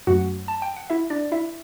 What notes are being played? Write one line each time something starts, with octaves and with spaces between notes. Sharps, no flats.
F#2 F#3 A3 F#4 F#5
A5
G5
F#5
E4 E5
D4 D5
E4 E5